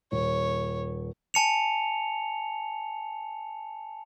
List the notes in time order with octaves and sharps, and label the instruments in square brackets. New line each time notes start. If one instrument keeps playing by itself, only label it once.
[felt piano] D#1 [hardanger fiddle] C#5
[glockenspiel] G#5 A5 C#7 F7